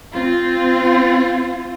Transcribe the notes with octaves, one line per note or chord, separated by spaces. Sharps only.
C4 F4